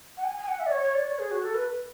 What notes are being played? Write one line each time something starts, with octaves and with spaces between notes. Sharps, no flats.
F#5
G#5
G#5
F#5
E5
D5
C#5
C#5
D5
C#5
G#4
F#4
A4
B4